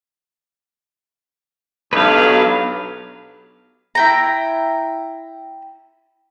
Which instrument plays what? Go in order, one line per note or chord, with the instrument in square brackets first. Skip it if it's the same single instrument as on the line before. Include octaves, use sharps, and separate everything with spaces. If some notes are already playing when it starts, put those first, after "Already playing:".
[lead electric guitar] B1 [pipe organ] F#3 D4 G4 [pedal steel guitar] B4 F5
[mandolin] E4 G5 A#5